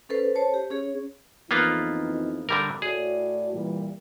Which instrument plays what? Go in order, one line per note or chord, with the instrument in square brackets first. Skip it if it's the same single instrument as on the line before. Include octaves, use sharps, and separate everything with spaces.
[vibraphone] C#4 A4 B4 C5
C5 C#5 A5
G4
C#4 G#4 C#5
[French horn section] F2 E3 D#4 [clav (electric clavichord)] A#3 B3 F4
[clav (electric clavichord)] D3 G3 A#4
[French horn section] A2 F#4 D5 [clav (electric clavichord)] G#4
[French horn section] A#2 E3 G3